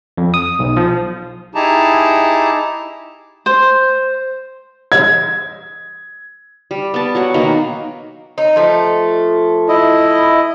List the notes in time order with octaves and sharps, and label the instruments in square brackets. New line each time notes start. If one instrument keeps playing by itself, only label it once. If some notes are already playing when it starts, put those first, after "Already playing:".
[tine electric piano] F2
D#6
B1
F3
[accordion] D#4 E4 G4 G#4 A5 A#5
[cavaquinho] C5
[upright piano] G#6
[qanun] G3
B3 A5
F#3 C#5 F#5
B2 D#3 A#3
[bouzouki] D#4
F3 A3
[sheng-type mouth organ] E4 D#5